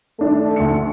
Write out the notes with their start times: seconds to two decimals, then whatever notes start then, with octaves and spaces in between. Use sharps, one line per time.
0.19 D#3 A3 D4 A4
0.56 D2 C#7